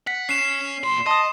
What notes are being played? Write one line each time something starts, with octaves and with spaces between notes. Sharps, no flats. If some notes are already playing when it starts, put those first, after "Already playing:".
F#5 B6
C#4 C7 E7
A#2 B5 C6
D#5 A5 C6 D#6